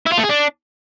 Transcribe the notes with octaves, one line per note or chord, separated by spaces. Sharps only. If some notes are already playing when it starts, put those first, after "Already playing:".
E4
F4
A3
G#4
D4